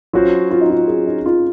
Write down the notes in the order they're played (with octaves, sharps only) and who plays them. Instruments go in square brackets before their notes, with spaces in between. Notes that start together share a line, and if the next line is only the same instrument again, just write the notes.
[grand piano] F#3 C#4 F#4 C5 [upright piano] F4
[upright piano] F4
D#4
F4
G#4
D#4
F4